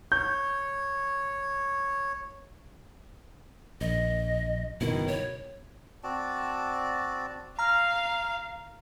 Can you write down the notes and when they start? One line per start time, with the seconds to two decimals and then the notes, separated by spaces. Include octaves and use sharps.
0.12 C#5 G6
3.81 A#1 D#5
4.81 F#1 B2 D#3 E4
5.08 C#5
6.04 C4 F#4 D5 A5
7.59 F5 A#5 F6